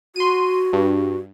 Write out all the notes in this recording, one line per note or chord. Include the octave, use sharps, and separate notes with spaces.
F#4 C6 D#7
G2